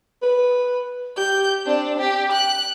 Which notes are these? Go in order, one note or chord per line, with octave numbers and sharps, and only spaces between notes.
B4
G4 G6
C4 D4
G4 G5
F#6